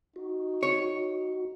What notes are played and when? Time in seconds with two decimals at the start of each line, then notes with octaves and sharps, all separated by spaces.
0.16 D#4 F#4
0.63 C#5